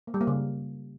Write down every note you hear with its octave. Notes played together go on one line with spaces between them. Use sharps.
A#3
G3
A#3
C#3